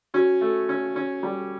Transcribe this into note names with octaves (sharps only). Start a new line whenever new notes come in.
C#4 F#4
A3
C#4
C#4
G3